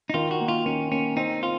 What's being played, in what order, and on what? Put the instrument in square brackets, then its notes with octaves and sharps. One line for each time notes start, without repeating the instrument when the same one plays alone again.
[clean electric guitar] D#4
[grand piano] D#3 [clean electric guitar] F4
[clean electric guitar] F#4
[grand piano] A#3
[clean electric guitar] F4
[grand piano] D#3 [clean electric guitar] C#4
[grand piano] A#3 [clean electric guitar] C#4
[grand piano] C4 [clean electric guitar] D#4
[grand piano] C4 [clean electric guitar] F4